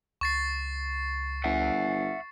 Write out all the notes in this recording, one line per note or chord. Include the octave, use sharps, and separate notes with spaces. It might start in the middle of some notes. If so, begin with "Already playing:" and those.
C#2 C#6 A6 C7
G1 E5 F#5